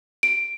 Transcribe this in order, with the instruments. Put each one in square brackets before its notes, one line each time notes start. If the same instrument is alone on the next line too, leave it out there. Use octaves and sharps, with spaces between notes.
[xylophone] D7